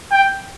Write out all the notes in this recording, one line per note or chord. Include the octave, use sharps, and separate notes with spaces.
G5